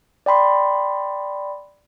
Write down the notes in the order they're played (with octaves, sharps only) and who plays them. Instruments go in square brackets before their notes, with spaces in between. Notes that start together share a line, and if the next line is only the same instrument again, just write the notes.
[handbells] D5 G5 B5 C6